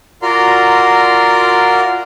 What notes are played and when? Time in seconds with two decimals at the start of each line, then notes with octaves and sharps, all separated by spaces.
0.22 F4 F#4 A#4 D5 A#5 C6